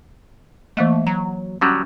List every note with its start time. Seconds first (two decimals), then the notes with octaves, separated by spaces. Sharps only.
0.77 E3 A3 A#3 D#5
1.07 F#3 A#5
1.61 D3 F#3 G3 C#4